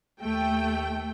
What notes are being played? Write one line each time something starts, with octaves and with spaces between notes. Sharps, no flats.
D#2 A3 G5